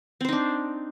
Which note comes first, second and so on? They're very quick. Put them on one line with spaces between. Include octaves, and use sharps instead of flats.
C4 C5 D#4 D4